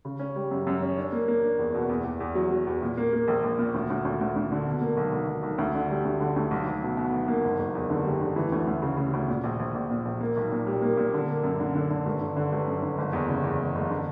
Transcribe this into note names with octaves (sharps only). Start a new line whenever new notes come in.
C#3
C#4
G3
F#2
F#2
C#4
D4
A#3
A#3
D4
E2
B2
E2
E2
E2
F#3
F#3
E2
A#2
A#3
A#3
A#1
A#1
A#2
D2
D2
D2
D2
D2
D3
B2
A#3
B1
B1
B1
B1
D2
D3
G3
D2
D3
D2
B1
B1
B2
B2
B1
A#3
F#1
F#1
E2
D3
G3
D3
E3
D2
D2
C#3
C#3
D2
A#2
A#1
A#1
A#1
A#2
A#1
A#3
B1
A#2
G3
A#3
A#2
D3
A#3
F#2
D3
D3
D3
G1
D3
D3
G1
F#2
D3
F#1
E2
C#3
E2
F#1
F#1
D3